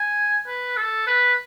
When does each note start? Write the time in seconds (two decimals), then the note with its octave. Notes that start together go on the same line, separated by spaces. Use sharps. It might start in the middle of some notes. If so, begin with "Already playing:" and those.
Already playing: G#5
0.47 B4
0.77 A4
1.07 B4